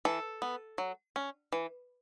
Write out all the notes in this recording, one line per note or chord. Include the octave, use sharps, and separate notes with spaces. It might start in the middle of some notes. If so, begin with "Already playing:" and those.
E3 A4
B3
F#3
C#4
E3